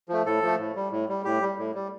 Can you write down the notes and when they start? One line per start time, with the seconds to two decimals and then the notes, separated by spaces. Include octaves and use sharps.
0.09 F3 A3
0.26 A2 A4
0.43 F3 A3
0.59 A2
0.75 G3
0.92 A2
1.09 G3
1.25 A2 G4
1.42 G3
1.58 A2
1.75 G3